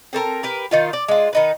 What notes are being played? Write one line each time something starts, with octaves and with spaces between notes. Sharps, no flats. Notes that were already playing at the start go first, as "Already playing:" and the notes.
C4 A4 A#4 A#5
G4 A#4 B4
D#3 D#4 F4
D5
G#3 F4
D#3 D#4 B4